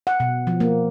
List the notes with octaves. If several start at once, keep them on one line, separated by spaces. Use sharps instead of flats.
F#5
B2
F3
A#3